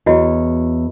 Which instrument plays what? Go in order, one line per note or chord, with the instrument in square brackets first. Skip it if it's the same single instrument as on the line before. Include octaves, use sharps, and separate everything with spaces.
[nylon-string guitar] E2 C#5 [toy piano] E4 F#4 D#5